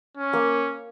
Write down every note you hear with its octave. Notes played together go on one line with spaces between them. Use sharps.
C#4
A#3